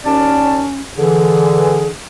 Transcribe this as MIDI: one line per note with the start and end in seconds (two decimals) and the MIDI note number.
0.05 0.63 39
0.05 0.79 61
0.05 0.63 74
0.05 0.63 81
0.97 1.88 50
0.97 1.88 52
0.97 1.87 68